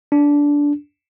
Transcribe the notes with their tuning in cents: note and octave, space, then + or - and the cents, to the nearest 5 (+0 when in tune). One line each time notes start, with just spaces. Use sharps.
D4 -15